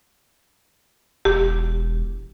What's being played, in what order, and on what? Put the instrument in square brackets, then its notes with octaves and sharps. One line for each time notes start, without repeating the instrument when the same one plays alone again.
[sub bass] E1 [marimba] G4